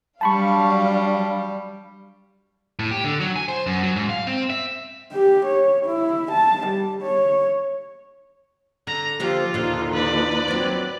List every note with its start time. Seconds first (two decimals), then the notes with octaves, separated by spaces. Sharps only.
0.21 F#3 G3 D4 F5 A5 B5 C#6
2.79 A2
2.91 G4
3.04 D3
3.20 F#3
3.36 G#5
3.48 C5
3.66 F#2
3.83 F#3
3.96 G#2
4.09 F5
4.27 C4
4.50 E5
5.13 G4
5.46 C#5
5.86 E4
6.32 A5
6.68 G3
7.03 C#5
8.87 D3 A#5
9.20 D3 F3 A#3 F4 G4
9.54 D#2 A#2 D3 F3 D#4
9.93 B4 D5
10.48 F#3 C4